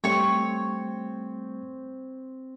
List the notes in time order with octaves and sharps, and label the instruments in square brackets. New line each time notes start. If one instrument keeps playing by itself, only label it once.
[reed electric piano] G3 A3 [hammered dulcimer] C4 [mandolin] C#5 C#6